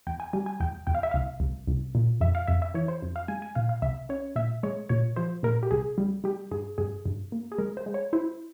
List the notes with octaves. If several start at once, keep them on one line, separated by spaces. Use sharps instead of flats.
E2 G5
G#5
G3 G#5
G#5
E2 G5
E2 G5
F5
E5
C2 F5
C2
C2
A#2
F2 E5
F5
F2 E5
E5
E3 C#5
C5
F2
F5
G#3 G#5
G#5
A#2 F5
F5
C2 E5
C#4 C#5
A#2 E5
G#3 C#5
A#2 C#5
F3 C5
A#2 A#4
G4
C2 G#4
G3
G3 G4
G2 G#4
G2 G#4
G2
A#3
G#4
G#3 A#4
C5
G#3
C#5
E4 C5